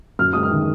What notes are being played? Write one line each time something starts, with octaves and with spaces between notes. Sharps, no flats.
F#2 F6
G#3 D#6
F6
D#3